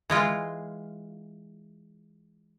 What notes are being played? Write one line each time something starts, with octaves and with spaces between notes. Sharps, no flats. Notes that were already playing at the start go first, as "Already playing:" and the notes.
E3 G#3 F4